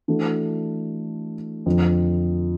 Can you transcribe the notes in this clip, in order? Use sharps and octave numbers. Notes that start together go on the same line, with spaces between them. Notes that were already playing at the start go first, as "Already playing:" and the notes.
E3 A3 D4 F#4 A4
F2 D3 F3